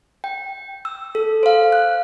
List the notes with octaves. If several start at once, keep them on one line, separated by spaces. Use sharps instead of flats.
G5
E6
A4
C5 F5
F#6